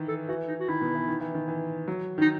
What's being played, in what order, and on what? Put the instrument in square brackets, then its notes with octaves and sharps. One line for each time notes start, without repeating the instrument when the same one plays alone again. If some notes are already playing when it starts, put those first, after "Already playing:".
Already playing: [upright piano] D#3 E3
[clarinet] A4
[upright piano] E3 [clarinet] F#4
[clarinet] D#4
F#4
[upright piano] D#3 [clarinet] E4
[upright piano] B2
E3
D#3
E3
D#3
E3
F#3
[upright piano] D#3 [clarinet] D#4